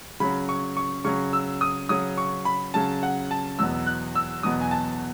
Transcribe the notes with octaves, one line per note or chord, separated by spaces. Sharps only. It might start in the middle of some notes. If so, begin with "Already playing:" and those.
C#3 F#3 C#4 B5
C#6
C#6
C#3 F#3 C#4 C#6
E6
D#6
C#3 F#3 C#4 D#6
C#6
B5
C#3 F#3 C#4 A5
F#5
A5
E2 B2 F#3 B3 E6
F#6
E6
E2 B2 F#3 B3 D#6
G#5
A5